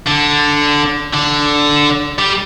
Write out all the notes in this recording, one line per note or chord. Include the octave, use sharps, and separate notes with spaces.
D3
D3
G3